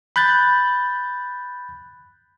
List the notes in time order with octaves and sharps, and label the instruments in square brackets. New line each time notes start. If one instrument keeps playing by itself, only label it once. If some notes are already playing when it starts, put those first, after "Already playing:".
[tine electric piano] B5 F#6 G6 A6